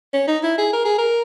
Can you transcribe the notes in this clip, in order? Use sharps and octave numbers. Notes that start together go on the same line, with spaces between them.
C#4
D#4
E4
G#4
A#4
G#4
A#4